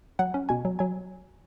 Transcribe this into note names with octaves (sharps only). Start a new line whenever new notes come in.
F#3 F#5
C#4
B2 G#5
F#3
F#3 G#5